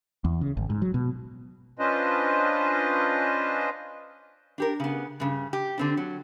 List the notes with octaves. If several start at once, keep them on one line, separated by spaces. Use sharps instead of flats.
E2
C#3
G#1
G#2
F#3
B2
C#4 D4 F4 B4 C5 D#5
D4 G4 A#4
C#3 B3
G2 C#3
G4
D3 C4 D4
F#3